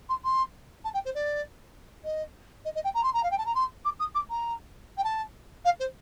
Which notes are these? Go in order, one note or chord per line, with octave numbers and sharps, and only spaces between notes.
C6
C6
A5
G5
C5
D5
D#5
D#5
D#5
G5
A#5
C6
A#5
F5
G5
A5
A#5
C6
D6
D#6
D6
A#5
G5
A5
F5
C5